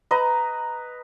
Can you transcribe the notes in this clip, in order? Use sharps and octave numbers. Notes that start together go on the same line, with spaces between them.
B4 D#5 A#5